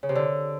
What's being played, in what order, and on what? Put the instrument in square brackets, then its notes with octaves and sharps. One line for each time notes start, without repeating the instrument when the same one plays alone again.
[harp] C#3
C3
D3